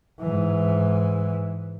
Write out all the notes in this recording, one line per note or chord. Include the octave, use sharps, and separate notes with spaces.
G#2 E3